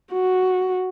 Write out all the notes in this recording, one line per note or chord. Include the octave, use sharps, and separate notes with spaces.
F#4